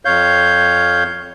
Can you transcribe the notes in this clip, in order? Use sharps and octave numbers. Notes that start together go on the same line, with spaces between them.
F2 C#5 F5 G6